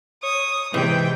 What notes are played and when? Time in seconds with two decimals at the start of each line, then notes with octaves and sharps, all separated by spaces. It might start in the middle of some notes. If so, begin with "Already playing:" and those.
0.23 C#5 D#6
0.74 C3 E3 G#3 G5